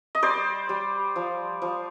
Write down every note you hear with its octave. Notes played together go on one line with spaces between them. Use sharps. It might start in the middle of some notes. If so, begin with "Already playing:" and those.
D#5
G3 C5 D5
G3
F3
F3